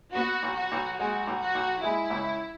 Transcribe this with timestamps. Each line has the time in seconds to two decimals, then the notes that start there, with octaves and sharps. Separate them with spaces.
0.15 B3 F#4
0.43 B1
0.57 F#4
0.72 B1
0.99 G#3 F#4
1.27 B1
1.41 F#4
1.55 B1
1.83 G#3 E4
2.10 C#2